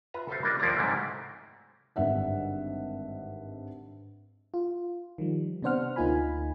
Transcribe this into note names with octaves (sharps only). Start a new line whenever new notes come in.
F4 B4 E5 A#5
F#4 A4 B4 C5 E5 F5
G3 A#3 D4 F4 A#4 D#5
D#2 F3 A#3 E4 D5 A#5
G#2 C3 F#3 G3 A3 A#3
G#1 G2 D3 E5 F#5
F4
D#3 F3 G3
C3 B3 D4 C5 F#5 F6
D2 A#3 D#4 F4 G#5 B5